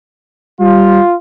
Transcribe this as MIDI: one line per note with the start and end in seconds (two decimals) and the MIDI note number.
0.60 0.99 55
0.60 1.14 65